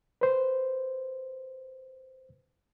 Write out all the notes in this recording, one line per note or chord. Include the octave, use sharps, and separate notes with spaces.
B4 C5